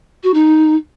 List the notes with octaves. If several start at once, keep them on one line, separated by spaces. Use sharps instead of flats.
F#4
D#4